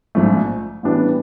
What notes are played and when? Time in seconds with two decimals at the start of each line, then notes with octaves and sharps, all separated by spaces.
0.15 A#1 G#2 F3 A3
0.83 A2 E3 G3 B3 D4